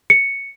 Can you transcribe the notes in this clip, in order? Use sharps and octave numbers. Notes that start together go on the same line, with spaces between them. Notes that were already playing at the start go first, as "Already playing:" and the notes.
C#7